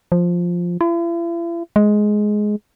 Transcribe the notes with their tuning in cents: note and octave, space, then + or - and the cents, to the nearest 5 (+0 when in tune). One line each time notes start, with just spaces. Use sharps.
F3 +5
E4 +45
G#3 +10